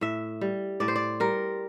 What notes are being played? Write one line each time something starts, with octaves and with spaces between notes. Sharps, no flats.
A2 E5
G3
A2 D5
C5
D5
G3 A#4